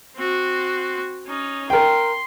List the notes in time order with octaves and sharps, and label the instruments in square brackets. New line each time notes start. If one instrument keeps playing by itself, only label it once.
[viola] C4 F#4
C#4 D#4
[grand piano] A#4 G5 [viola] C6